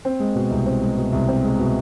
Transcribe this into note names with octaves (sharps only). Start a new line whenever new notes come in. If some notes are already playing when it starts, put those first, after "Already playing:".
C4
G#3
B2
C2
C4
G#3
B2
C2
C4
G#3
B2